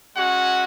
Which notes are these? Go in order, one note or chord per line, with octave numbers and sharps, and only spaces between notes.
G#3 C#4 F#4 F#5